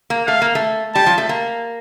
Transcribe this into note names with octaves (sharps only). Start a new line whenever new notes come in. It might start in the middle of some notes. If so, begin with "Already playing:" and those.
A#3
A3 F5
A#3
A3
G3 A5
F3
A3
A#3